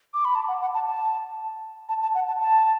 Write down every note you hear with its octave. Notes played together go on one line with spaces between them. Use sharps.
D6
B5
A5
F#5
F#5
A5
A5
A5
A5
F#5
A5
A5